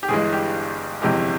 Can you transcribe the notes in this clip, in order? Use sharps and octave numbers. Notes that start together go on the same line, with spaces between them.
G4
G1 G2 E3 G#3 G#4
G4
G1 F2 C3 E3 G#3 G4